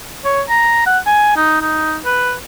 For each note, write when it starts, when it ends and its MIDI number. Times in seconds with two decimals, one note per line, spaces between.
0.25 0.42 73
0.49 0.82 82
0.86 0.98 78
1.06 1.32 80
1.37 1.61 63
1.61 1.97 63
2.05 2.34 71